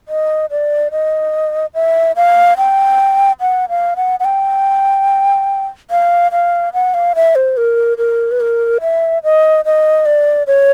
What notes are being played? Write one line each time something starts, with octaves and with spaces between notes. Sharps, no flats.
D#5
D5
D#5
E5
F5
G5
F#5
F5
F#5
F#5
G5
F5
F5
F#5
F5
E5
C5
A#4
A#4
B4
A#4
E5
D#5
D#5
D5
C#5